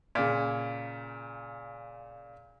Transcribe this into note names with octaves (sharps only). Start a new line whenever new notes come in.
A#2 C#3